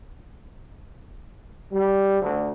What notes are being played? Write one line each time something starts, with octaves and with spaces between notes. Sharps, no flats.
G3
D2